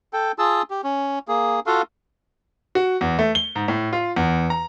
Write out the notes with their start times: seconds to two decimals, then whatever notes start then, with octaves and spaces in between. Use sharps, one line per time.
0.13 A4 G5
0.39 F4 G#4 A5 E6
0.70 G4
0.84 C#4
1.28 A#3 G#4
1.66 F4 F#4 A4 F5
2.75 F#4
3.01 E2
3.19 A3
3.35 G7
3.55 G#2
3.68 A2
3.93 F4
4.16 E2
4.50 A#5